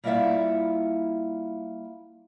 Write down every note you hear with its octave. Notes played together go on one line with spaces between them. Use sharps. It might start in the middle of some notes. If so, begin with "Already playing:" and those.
G3 A#3 E4 F4 E5 F#5